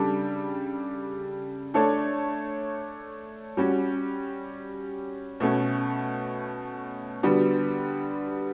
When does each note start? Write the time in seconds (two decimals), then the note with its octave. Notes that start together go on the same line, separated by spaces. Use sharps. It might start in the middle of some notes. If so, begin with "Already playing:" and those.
Already playing: C#3 G3 D4 A4
1.74 A3 D4 A4 C#5
3.57 G3 C#4 F#4
5.40 B2 A3 C#4
7.23 D3 G3 B3 F#4